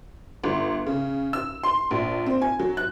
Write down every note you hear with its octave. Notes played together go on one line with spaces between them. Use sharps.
G1
C#3
E6
C6
A#1
C4
G#5
F#3
F#6